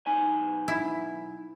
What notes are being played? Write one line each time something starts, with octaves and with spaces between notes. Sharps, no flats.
B1 D#4 G#5
E4